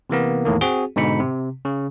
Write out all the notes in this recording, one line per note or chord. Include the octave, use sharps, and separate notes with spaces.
C3 E3 A#3 B3
E2 A2 D#3 A#3
C4 F#4 G#4
G#2 B2 D3 D#4 B5 C#7
C3
C#3